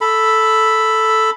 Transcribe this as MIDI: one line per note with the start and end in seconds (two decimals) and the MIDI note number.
0.01 1.30 69
0.01 1.30 83